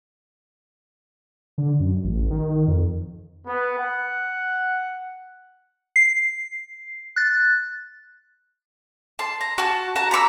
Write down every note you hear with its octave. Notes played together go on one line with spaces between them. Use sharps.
D3
F#2
A1
D#3
F2
B3
F#5
C7
F#6 A6
A5 C6
A#5
F#4 A5
F#4 A5 A#5
A#5 B5 C#6 E6